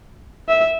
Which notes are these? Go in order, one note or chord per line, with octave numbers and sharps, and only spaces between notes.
E5